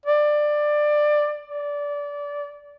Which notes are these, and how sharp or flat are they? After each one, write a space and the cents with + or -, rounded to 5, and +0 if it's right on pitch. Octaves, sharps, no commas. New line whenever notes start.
D5 +20
D5 -20